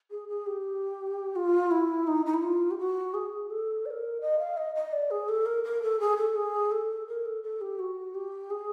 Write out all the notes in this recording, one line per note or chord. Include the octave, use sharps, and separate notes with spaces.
G#4
G#4
G4
F4
E4
D#4
D#4
E4
F4
G4
F#4
G#4
A4
D5
A#4
D#5
F5
D#5
D#5
D5
G#4
A4
A#4
A#4
A4
G#4
A4
G#4
A4
A#4
A4
A4
G4
F#4
G4
G#4